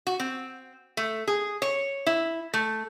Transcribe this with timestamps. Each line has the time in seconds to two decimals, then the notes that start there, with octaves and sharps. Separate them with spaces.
0.07 F#4
0.20 C4
0.97 A3
1.28 G#4
1.62 C#5
2.06 E4
2.54 A3